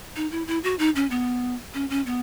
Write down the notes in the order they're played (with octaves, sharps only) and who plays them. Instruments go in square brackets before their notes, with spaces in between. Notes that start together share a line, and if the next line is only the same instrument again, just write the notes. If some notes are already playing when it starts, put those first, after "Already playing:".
[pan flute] D#4
E4
E4
F#4
D#4
C#4
B3
C#4
C#4
B3